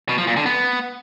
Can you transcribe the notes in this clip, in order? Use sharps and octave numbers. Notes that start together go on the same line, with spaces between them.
B2
F3
A#2
D3
B3